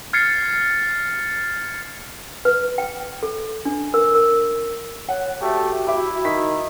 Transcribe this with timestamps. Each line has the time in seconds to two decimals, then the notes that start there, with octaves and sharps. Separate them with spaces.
0.13 F6 G#6 A6 C7 C#7
2.45 B4
2.78 G5
3.23 A4
3.65 D4
3.94 A#4
4.15 A#4
5.09 C#5 F#5
5.42 A3 F#4 G4
5.87 E4 E5 D6
6.25 D#3 B6